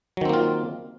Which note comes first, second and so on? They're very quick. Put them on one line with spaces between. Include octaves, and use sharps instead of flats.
F#3 D#3 C4 A#3 F4